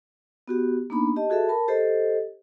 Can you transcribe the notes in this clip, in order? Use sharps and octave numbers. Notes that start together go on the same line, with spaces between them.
B3 F#4 G4
A#3 B3 D4 D#4 B5
G4 D#5 A5
F#4 G#4 A4 E5 A5
A#4 A5 B5
G4 A4 C5 D#5